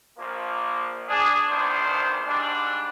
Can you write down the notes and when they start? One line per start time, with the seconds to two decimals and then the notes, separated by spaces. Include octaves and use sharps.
0.18 A#1 F3 A#3
1.09 D4 G#4
1.49 A#1 E2 D#3 D4 C5
2.27 G#2 G3 D4